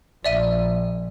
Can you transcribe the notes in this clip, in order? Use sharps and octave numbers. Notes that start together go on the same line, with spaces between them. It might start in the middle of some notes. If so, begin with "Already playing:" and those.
A#1 D5 E5 D#7